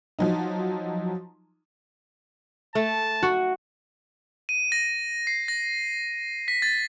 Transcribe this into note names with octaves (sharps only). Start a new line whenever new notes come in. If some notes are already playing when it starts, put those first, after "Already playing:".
F3 F#3 D#4
A3 A5
F#4
D#7
A#6
C7
A#6
B6
A6